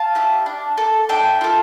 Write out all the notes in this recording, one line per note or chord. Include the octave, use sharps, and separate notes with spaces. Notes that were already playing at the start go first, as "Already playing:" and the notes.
Already playing: F5 A5
E4 G4
D4
A4
D4 E5 G5
F4 A4